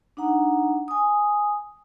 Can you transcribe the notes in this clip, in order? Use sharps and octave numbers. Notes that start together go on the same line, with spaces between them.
D4 D#4 F#5 A#5
G#5 D#6